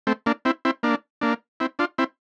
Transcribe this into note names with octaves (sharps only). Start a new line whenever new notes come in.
A3 C4
A#3 D4
C4 E4
C4 E4
A#3 D4
A#3 D4
C4 E4
D4 F4
C4 E4